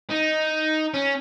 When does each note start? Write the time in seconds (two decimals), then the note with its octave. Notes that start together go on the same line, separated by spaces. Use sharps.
0.11 D#4
0.94 C#4